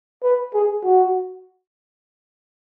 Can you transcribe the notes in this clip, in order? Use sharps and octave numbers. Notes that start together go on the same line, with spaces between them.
B4
G#4
F#4